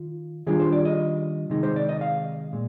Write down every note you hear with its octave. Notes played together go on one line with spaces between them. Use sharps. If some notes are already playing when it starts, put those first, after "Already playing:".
Already playing: D#3 F4
D#3 G3 D4 F4 G#4
C5
D5
D#5
C3 D#3 G#3 D#4
C5
D5
D#5
F5
A#2 G#3